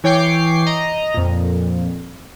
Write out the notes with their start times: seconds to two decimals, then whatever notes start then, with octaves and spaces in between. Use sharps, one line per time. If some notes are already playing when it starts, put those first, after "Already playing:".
0.04 E3 C#5 G5 D6 C7
0.66 D#5 A#5
1.14 F2 A#2